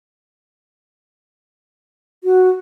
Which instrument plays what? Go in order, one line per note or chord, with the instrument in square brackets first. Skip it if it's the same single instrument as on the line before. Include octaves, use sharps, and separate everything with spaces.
[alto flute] F#4